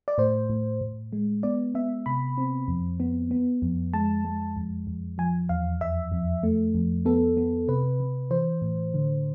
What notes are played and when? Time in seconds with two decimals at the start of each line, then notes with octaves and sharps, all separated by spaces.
0.08 D5
0.18 A2 C5
0.50 A2
0.81 A2
1.13 G#3
1.43 B3 D5
1.75 B3 E5
2.06 C3 B5
2.38 C4
2.68 F2
3.00 B3
3.31 B3
3.62 F2
3.94 G#3 A5
4.25 G#3
4.57 F2
4.87 F2
5.18 F3 G#5
5.49 E2 F5
5.81 F2 E5
6.12 F2
6.43 A3
6.75 F2
7.05 B3 A4
7.37 B3
7.68 C3 B4
8.00 C3
8.31 E3 C5
8.62 A2
8.94 D3